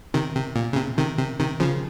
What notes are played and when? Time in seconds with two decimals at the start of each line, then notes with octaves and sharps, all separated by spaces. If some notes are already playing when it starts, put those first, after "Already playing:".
0.14 C3 D#3
0.35 C3
0.56 A#2
0.73 C#3
0.76 C3
0.98 C3 D#3
1.18 C3
1.39 C3 D#3
1.60 C#3 F3